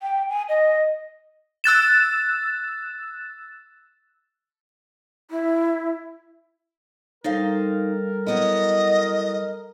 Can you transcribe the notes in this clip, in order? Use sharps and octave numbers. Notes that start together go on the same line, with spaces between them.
G5
G#5
D#5
E6 F#6 A6 E7
E4
G3 D#4 A4 A#4 C5 F5
F#3 B3 E4 D#5